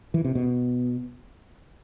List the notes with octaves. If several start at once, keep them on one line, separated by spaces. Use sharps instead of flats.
E3
C3
B2